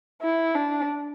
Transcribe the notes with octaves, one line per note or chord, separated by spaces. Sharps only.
E4
D4